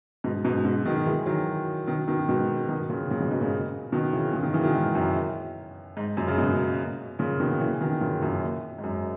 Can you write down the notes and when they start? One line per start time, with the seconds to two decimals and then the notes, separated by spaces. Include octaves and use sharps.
0.24 G#2 B2
0.45 G#2 B2
0.65 G#2 B2
0.86 B2 D#3
1.06 E3 G#3
1.26 D#3 F#3
1.87 B2 D#3
2.08 B2 D#3
2.28 G#2 B2
2.69 B2 D#3
2.90 A#2 C#3
3.10 A#2 C#3
3.20 G#2 B2
3.31 G#2 B2
3.41 A#2 C#3
3.92 B2 D#3
4.13 C#3 E3
4.33 A#2 C#3
4.43 B2 D#3
4.53 C#3 E3
4.64 B2 D#3
4.74 G#2
4.95 F#2
5.97 G#2
6.17 F#2 A#2
6.28 C#3
6.38 G#2 B2
7.19 A#2 C#3
7.40 B2 D#3
7.60 C#3 E3
7.81 B2 D#3
8.01 A#2 C#3
8.21 F#2 A#2
8.78 G#2
8.84 F#2